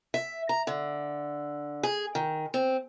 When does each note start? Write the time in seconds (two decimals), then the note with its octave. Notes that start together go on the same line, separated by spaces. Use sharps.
0.14 E5
0.49 A#5
0.67 D3
1.83 G#4
2.15 D#3
2.54 C4